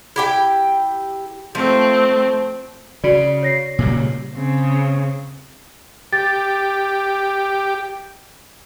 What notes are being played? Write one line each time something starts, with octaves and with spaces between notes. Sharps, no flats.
E4 G4 G5
F3 A3 C4
C#3 F#4 D5
C#5 A#6 C7
A#2 C#3 G3
C#3 C4
G4 A6